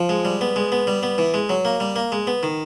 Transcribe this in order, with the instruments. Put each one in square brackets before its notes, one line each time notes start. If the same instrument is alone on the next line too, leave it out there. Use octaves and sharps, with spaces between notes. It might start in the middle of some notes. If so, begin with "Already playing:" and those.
Already playing: [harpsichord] F3
G#3
G3
B3
G#3
B3
G3
B3
E3
G#3
F#3
A#3
G3
A#3
G#3
B3
D#3